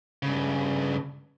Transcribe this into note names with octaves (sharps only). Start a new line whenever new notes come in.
G2 C#3